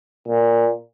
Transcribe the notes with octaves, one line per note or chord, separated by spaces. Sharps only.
A#2